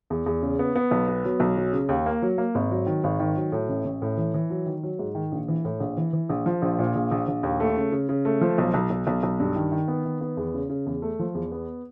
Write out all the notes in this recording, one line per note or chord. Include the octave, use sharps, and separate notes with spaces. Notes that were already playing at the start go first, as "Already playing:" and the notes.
E2
E2
C#3
B3
B3
B1
B3
F#3
B1
F#3
C#3
D#2
A#3
F#3
A#3
G#1
F#3
D#3
G#1
D#3
F#3
A2
A1
A1
A2
E3
E3
F#3
D#3
F#3
G#2
D#3
A#1
E3
A2
A#1
E3
E3
A#1
F3
A#1
A#2
A#1
A#1
A#1
D#2
A3
C#3
C#3
C#3
A3
F3
B1
B1
B1
B1
B1
G2
D#3
D#3
B3
D#3
B3
E2
C#3
C#3
E2
A3
F3
E2
B3